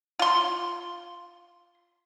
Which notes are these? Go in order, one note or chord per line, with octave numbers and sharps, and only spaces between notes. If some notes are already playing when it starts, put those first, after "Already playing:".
F4 C6